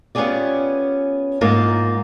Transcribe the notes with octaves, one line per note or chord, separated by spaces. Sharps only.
B3 C#4 F4 G4 G#4 D5
G#2 A#3 F4